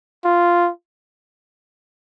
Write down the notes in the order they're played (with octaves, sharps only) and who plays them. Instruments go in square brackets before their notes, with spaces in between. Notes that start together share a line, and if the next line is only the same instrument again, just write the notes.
[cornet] F4